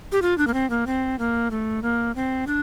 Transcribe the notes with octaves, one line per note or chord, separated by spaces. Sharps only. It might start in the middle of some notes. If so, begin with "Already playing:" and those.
G4
F4
D4
A#3
C4
A#3
C4
A#3
A3
A#3
C4
D4